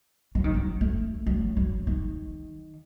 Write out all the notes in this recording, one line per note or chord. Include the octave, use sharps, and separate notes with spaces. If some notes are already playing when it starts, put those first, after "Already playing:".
F#3
D#3
F#3
A3
F#3
F#3
D#3